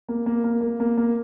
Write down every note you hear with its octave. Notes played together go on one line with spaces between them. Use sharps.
A#3
A#3
A#3
A#3
A#3
A#3